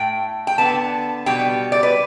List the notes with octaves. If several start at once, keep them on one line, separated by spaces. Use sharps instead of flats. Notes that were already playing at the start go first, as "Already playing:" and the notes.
Already playing: A2 A3 G5
G5
D3 B3 A5
B2 G3 B3 G5
D5
B4